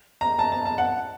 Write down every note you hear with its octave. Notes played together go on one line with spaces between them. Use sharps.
A#5
A5
A5
A5
F#5